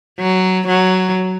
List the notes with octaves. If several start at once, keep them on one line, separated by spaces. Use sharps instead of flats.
F#3
F#3